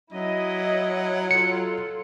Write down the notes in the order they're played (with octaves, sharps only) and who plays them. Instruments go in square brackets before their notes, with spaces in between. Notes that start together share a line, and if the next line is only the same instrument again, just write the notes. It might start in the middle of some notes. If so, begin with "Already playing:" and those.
[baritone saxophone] F#3 [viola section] E4 D#5
[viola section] F4 A4 [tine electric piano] C#7